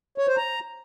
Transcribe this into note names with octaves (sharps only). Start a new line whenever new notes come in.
C#5
C5
A#5